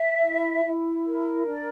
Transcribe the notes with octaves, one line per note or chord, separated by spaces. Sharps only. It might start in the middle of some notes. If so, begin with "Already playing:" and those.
Already playing: E5
E4
E4
A#4
D4 D5